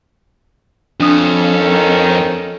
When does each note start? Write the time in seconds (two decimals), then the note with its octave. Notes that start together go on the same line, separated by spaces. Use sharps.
1.00 F2 C#4 D4 A4 D#6
1.59 D#3